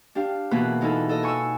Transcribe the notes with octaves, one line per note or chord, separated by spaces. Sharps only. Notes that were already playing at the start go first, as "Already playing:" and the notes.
D4 G4 F5
B2 E3 A#3 G#4 B5 F#6
E3 D#4 F4 G#4 A4
A4 D#5
G#5 C#6 D#6 E6